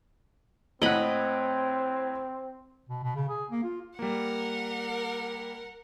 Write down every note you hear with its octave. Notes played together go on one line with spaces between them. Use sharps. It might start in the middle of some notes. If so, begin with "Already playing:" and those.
A2 C4 D#5 F#5 B5
B2
B2
C#3
G#4
A#3
F4
G3 A#3 A#4 F#5